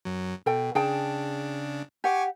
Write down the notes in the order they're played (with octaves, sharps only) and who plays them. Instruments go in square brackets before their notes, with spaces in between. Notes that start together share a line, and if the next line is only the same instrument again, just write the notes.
[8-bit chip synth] F#2 F#3
[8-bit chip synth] B2 [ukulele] A4 G5
[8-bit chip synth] C#3 D4 [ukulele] G#4 G5 A5
[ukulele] G4 F#5 [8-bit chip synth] G#5 C#6 D6